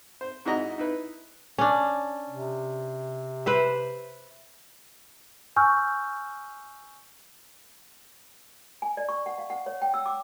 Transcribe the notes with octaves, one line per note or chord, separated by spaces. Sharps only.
C5
G#2 E4 F#4 D#5 A#5
D#4 E4 B4
C#4 D4
C3
B4 C5 E5
G#5 C#6 E6 F6 G6
G#5
D5
C#6
F#5
F5
F#5
C#5
G5
E6
D6